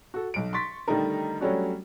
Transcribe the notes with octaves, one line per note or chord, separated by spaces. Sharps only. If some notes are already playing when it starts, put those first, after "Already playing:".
F#4 A4
B1 D7
C6 C#6 A6 B6
D3 D#3 G3 A3 D#4 A#4
F#3 G3 A3 C#4 D4 F#4